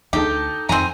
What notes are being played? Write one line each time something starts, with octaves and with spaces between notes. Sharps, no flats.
D2 D#4 G4 A4
F2 D#3 C4 G#5 A#5